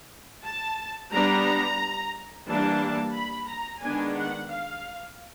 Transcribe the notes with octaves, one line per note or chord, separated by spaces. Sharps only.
A5
G3 B3 D4 A#5
E3 G3 A#3 D4 A5
B5
A#5
D#3 G#3 B3 D4 G#5
F#5
F5